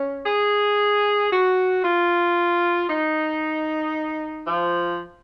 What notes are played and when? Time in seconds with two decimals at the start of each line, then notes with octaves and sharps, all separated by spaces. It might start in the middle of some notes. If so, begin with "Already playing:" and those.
Already playing: C#4
0.26 G#4
1.32 F#4
1.84 F4
2.89 D#4
4.46 F3